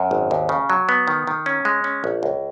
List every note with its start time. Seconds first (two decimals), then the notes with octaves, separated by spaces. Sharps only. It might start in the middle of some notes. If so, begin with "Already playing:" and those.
Already playing: F#2
0.11 G#1
0.31 D#2
0.49 C#3
0.70 F#3
0.89 B3
1.08 D#3
1.27 D#3
1.46 C#4
1.65 G#3
1.84 C#4
2.04 A#1
2.23 C#2